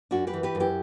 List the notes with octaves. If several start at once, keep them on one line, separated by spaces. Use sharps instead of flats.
F#2 D4 F#4
G4 B4
E3
G4 B4
F#2
E4 G4